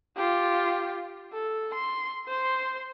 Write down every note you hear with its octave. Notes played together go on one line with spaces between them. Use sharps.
F4 G4
A4
C6
C5 C6